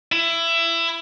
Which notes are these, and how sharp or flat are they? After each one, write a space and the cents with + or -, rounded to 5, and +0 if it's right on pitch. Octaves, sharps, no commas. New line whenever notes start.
E4 +20